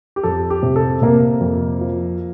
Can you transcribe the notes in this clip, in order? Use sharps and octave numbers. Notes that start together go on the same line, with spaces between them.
G4
F2 A4
G4
C3
A4
C3 A#3 A#4
F2
F3